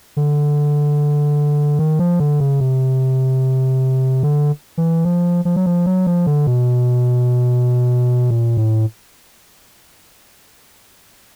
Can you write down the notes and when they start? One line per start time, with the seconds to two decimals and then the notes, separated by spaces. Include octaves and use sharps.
0.17 D3
1.79 D#3
1.99 F3
2.20 D3
2.40 C#3
2.60 C3
4.23 D3
4.78 E3
5.05 F3
5.45 F3
5.56 F#3
5.66 F3
5.86 F#3
6.07 F3
6.27 D3
6.47 B2
8.31 A#2
8.57 A2